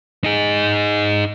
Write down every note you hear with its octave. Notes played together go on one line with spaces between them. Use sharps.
D#4 G#4